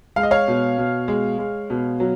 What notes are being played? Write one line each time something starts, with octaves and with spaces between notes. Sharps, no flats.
G#3 F5
D#5
C#5 F5
B2
B2
G#3
G#3
B2
F#3